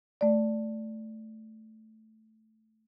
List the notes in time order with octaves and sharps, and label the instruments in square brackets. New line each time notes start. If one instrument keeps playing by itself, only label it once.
[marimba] A3 D5